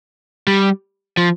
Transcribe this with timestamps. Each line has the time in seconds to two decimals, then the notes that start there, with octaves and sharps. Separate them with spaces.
0.47 G3
1.17 F3